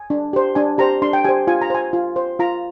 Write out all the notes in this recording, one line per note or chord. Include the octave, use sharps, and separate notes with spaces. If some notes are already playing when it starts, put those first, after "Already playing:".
Already playing: G#5
D4
G4 C5
D4 G#5
G4 C5 A#5
D4 C6
G5
G4 C5 G#5
F4 G#5
A#5
C5 G#5
F4
C5
F4 A#5